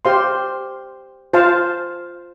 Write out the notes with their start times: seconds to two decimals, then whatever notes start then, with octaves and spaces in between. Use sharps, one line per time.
0.05 G4 C5 F5 C6
1.33 F4 C5 F5 A5